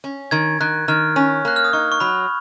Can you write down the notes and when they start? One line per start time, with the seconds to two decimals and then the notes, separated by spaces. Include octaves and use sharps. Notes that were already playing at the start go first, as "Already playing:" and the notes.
0.04 C#4
0.31 D#3 G#6
0.61 D#3 F#6
0.88 D#3 F6
1.16 C#4
1.45 A#3 F#6
1.56 F6
1.65 D#6
1.73 D#4 C#6
1.92 C#6
2.00 F#3 B5